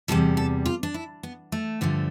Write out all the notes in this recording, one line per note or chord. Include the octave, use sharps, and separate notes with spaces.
E2 C3 G3 A4
A4
F4
D4
E4
B3
A3
G2 D3 F3 A3